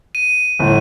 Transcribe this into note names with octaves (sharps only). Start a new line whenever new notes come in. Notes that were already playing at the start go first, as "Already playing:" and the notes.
D#7
G1 A2